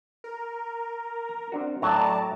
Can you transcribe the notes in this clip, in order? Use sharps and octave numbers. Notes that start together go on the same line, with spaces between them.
A#4
A#5
C4 D4 F#4
A2 F#3 A4 D5 A5 A#5